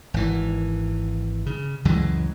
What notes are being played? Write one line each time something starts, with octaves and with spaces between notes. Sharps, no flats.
G#1 E3
C#3
C#2 F#2 E3 G#3